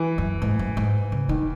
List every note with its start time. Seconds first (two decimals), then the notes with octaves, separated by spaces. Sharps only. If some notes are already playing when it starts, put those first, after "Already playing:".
Already playing: E3
0.18 F#2
0.42 G#2
0.59 F#2
0.77 G#2
1.12 C#3
1.29 D#3